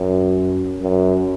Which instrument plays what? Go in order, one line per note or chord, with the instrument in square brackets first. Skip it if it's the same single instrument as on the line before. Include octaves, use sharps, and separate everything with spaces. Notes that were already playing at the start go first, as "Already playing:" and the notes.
Already playing: [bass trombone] F#2
F#2